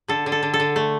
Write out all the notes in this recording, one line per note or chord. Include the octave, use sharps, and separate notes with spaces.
D3 A4
D3
A4
D3
A4
D3
A3